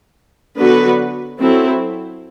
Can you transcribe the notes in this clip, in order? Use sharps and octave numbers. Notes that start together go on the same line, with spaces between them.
D3 F#3 B3 F#4 B4
F#3 C4 E4 A4